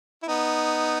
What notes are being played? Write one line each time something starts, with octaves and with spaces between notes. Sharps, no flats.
E4
B3 D#4